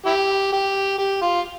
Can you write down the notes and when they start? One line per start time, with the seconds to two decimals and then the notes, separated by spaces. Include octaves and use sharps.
0.06 E4 G4
0.53 G4
0.99 G4
1.22 F4